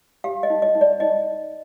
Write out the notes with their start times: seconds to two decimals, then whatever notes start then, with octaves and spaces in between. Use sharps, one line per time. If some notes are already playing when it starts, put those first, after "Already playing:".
0.24 G4 F5
0.43 D#5
0.50 D#4
0.62 D#5
0.75 D#4
0.81 D5
1.00 D#4 D#5